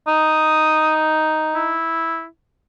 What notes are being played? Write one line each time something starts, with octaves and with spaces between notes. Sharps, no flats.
D#4 D#6
E4